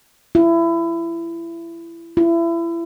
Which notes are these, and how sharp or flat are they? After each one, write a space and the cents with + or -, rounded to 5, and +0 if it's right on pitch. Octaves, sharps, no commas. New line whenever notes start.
E4 +25
E4 +30